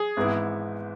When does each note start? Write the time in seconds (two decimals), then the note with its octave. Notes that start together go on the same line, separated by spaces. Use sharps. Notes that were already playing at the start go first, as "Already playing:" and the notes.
Already playing: G#4
0.17 G#1 G#2 E3 B3 E4